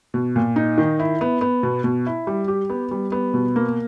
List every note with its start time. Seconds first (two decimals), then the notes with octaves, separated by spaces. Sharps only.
0.14 B2
0.36 A#2
0.56 D#4
0.78 D#3
0.99 E4
1.21 B3
1.41 B3
1.63 B2
1.84 B2
2.06 E4
2.27 G3
2.48 G4
2.70 B3
2.91 G3
3.12 B3
3.34 B2
3.56 A#3